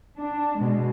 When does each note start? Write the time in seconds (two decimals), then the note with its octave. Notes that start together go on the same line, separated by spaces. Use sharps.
0.18 D4
0.60 B2 G#3